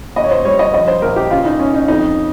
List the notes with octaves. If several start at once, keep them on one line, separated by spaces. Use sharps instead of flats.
D#2 D#5
C#5
C5
G3 C#5
D#5
F3 D#5
C5
A#1 A#4
G4
C#3 F4
D#4
G1 C#4
D#4
F2 D#4